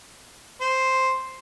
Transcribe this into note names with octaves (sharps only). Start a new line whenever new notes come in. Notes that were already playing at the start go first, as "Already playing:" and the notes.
C5